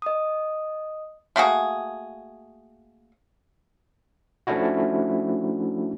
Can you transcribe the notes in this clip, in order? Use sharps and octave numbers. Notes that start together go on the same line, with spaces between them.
D#5 D#6
A3 A#3 F#4 G#4
F3 A3 C#4 D4 E4 F#4